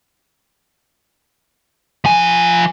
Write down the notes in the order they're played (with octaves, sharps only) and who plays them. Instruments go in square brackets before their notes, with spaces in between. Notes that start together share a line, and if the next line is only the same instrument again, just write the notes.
[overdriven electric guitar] F3 G#5